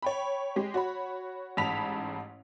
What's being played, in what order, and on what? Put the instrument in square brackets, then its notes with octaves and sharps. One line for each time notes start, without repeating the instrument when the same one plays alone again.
[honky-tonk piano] C#5 G5 B5
G#3 G4
F#4 C#5 B5
A1 G#2 A5 B5 B6 F7